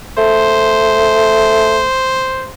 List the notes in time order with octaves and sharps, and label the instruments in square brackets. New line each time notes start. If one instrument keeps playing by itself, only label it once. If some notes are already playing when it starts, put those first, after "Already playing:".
[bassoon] A3 [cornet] C5